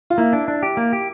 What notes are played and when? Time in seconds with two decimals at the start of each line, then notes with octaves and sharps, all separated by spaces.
0.10 F4
0.18 A#3 E4
0.33 D4
0.48 D4
0.63 G4
0.77 A#3
0.93 G4